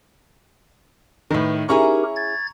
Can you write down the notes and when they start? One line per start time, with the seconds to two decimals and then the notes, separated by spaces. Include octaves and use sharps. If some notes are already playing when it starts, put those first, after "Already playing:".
1.31 A2 D#3 A#4 B4
1.69 C#4 D#4 E4 G4 G#4 A#4 A#5 C#6
2.16 G#6 A6